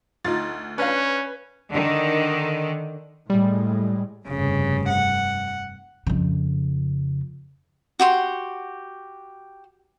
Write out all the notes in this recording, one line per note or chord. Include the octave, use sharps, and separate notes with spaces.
D2 D#4 F4 A6
C#4 D4 B4 F5
D3 D#3
A2 G3 G#3
F1 G2 C#3
F#5
F2 C#3
F#4 G4 C6